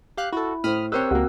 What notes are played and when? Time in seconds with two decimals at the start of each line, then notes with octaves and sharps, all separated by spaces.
0.17 G4 F5 F#6
0.32 E4 F#4 A4
0.64 A2 C5 B5 D#6 F6
0.92 C4 G4 A#4 C5 C#5 E6 F#6
1.11 C#2 A#3 F#4